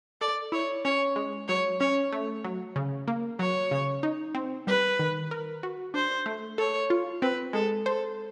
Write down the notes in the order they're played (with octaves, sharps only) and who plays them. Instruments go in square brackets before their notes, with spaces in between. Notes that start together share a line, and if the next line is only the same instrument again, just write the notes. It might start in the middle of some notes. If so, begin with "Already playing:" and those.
[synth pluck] A4 [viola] D5
[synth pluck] E4 [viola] C#5
[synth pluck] C#4 [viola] C#5
[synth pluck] G#3
[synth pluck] F#3 [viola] C#5
[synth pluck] C#4 [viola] C#5
[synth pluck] A3
F#3
C#3
A#3
[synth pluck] F#3 [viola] C#5
[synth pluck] C#3
D#4
C4
[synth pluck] G3 [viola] B4
[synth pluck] D#3
A#4
F#4
[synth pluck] D4 [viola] C5
[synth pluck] A3
[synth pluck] A4 [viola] C#5
[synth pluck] F4
[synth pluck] C4 [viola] B4
[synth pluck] G#3 [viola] A4
[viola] A4 [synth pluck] C5